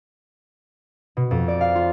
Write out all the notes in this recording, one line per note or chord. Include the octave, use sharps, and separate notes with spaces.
B2
F2
D5
F5
F4